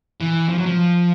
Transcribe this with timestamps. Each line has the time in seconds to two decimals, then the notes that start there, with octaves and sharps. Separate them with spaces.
0.21 E3
0.49 F3
0.58 F#3
0.66 F3